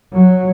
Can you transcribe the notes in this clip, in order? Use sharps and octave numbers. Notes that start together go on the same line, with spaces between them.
F#3